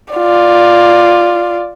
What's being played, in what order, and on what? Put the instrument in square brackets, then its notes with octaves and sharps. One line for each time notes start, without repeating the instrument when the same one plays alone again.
[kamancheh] F4 D5